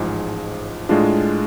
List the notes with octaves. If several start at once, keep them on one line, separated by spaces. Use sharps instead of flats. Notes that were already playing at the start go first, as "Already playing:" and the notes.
Already playing: A1 G#2 F3 G#3
A2 G#3 D4 F4